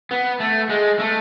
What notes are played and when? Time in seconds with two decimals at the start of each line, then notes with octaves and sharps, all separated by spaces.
0.11 B3
0.40 A3
0.70 G#3
0.99 A3